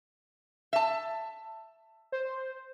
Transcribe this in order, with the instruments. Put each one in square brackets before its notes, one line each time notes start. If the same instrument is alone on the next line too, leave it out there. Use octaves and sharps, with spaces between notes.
[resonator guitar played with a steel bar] E5 A5
[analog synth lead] C5